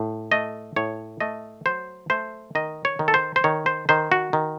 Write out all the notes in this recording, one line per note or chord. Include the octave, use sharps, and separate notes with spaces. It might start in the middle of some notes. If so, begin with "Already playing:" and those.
Already playing: A2
A3 D#5
A2 C#5
A3 D#5
F#3 C5
A3 C5
D#3 D#5
C#5
D#3
A4
C5
C5
D#3 C#5
C5
D#3 C5
F#4
D#3